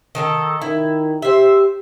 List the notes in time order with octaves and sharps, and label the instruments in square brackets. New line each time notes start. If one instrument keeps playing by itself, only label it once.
[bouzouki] D#3 A4 A#5
[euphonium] D#3 [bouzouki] E4
[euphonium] G4 [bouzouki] C5 E5